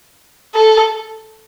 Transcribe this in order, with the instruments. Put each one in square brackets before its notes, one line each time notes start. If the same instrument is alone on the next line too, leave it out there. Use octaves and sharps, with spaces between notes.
[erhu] A4